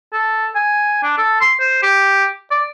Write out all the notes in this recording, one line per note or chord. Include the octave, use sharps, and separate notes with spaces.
A4
G#5
D4
A4
C6
C5
G4
D5